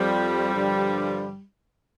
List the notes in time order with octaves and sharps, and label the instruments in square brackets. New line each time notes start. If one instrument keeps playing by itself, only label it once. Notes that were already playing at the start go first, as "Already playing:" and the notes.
Already playing: [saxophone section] F2 F3 G3
G2 D3 F3